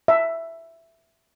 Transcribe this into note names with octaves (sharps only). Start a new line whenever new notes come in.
E5